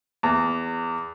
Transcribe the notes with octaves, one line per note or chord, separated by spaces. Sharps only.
E2